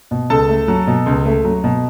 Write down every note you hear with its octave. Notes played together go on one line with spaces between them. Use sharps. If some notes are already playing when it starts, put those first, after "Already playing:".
B2
C#2 A4 A5
A3
F#3
B2
C#2
A3
F#3
B2